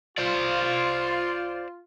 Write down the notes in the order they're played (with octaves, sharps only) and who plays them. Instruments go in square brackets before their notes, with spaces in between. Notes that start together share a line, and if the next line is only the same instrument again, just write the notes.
[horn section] F4 [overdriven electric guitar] C5 D5